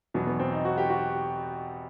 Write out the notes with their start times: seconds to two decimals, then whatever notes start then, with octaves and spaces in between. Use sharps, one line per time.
0.14 E2 B2 F#3 B3
0.27 B3
0.39 C4
0.52 D#4
0.65 F#4
0.78 G4
0.90 F#4